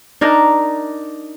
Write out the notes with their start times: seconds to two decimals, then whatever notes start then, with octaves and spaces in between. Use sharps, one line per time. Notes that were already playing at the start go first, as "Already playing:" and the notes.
0.21 D4 D#4 A#4